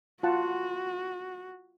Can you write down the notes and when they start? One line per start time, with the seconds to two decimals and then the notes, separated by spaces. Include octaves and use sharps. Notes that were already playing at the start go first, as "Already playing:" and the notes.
0.23 F4 F#4 F#5 A5